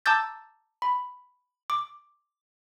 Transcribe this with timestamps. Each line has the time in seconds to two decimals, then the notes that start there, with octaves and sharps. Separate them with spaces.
0.06 A5 A#5 D6 E6 G6 A6
0.82 B5
1.70 D6